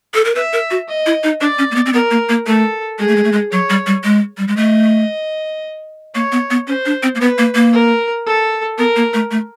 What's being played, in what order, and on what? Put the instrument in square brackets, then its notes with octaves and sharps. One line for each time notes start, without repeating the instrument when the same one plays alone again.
[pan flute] A4
A#4
[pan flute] B4 [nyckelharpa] E5
[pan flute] A#4
F#4
[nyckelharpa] D#5
[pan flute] E4
D#4
[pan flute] D4 [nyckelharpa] D5
[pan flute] C#4
A#3
B3
C4
[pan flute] B3 [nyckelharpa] A#4
[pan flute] A#3
A#3
[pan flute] A3 [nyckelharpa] A4
[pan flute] G#3 [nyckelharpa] G#4
[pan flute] A3
G#3
A3
G#3
[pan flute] F#3 [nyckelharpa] C#5
[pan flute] G3
G3
G#3
G3
G#3
[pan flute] A3 [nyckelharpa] D#5
[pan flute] A#3 [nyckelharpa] C#5
[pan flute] B3
B3
[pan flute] C#4 [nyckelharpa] C5
[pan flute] D4
C4
A#3
[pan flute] B3 [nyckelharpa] B4
[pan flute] A#3
A#3
[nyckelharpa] A#4
A4
[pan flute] B3 [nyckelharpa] A#4
[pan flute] A#3
A3
A3